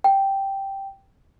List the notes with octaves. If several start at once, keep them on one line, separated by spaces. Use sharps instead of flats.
G5